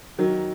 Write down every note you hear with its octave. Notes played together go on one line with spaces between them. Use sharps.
D#3 F#3